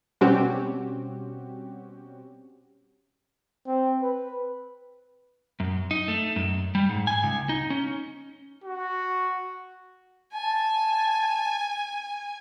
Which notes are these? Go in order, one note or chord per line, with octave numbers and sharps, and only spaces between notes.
B2 G3 C4 C#4 F#4 G4
C4
B4
F#2
D#4
A3
F#2
G3
G#2
G#5
C#2
D#4
C#4
F#4
G#5 A5